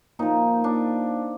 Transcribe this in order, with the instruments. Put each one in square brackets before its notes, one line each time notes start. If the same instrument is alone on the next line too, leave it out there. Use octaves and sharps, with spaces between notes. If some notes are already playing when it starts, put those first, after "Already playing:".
[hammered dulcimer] A#2 F3 D#4
F3 D4